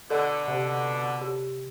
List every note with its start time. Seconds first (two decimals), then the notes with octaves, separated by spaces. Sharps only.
0.10 B2 D3 A4
0.48 C3
1.21 G4